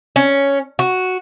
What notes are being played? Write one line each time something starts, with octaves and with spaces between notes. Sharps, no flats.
C#4
F#4